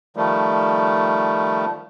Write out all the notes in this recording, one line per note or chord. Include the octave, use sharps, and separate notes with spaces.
D#3 F3 G3 A3